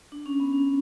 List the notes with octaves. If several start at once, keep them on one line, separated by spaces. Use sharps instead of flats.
D4
C#4
B3
C#4